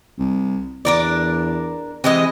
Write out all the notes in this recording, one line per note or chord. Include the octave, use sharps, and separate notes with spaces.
C2
E2 D4 A#4 D5
C3 E3 G#3 D#5